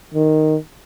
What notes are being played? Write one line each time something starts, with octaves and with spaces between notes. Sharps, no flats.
D#3